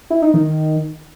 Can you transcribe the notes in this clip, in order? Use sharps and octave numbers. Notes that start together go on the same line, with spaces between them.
E4
D#4
D#3